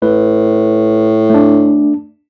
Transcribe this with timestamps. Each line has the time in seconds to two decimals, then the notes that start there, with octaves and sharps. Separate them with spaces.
0.02 A2 B4
1.30 A3 D4